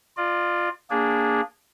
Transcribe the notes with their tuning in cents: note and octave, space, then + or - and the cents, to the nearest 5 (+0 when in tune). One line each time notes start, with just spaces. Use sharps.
F4 +0 D5 +40
A#3 +0 D4 -15 G#4 -15